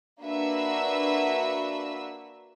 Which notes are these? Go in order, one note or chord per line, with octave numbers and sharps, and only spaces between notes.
A#3 D4 F#4 B4 E5 E6